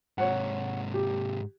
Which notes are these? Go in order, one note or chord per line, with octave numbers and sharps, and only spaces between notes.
G#2 C3 C#5 F#5
G4